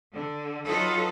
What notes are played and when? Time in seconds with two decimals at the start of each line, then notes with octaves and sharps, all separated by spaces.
0.13 D3
0.67 F#3 D#4 F4 A4 B4